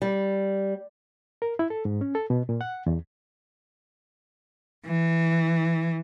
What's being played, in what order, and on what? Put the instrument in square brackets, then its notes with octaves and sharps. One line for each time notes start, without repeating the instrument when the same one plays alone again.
[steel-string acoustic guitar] G3
[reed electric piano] A#4
E4
A4
G#2
C#4
A4
B2
A#2
F#5
E2
[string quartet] E3